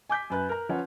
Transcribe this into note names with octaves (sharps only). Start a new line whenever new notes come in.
G#5 D6 G6 B6
F#2 B4 F#6
A#4 A#5
F3 C#4 B4 F#5